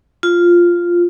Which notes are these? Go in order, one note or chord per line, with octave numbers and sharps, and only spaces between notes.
F4